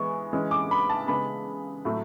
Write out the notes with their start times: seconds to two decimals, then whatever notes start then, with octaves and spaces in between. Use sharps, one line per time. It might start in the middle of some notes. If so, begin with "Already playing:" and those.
Already playing: E3 G#3 B3 C#6
0.33 E3 G#3 C#4
0.51 D6
0.71 B5
0.89 A5
1.08 C#3 G#3 B3 B5
1.85 A2 F#3 A3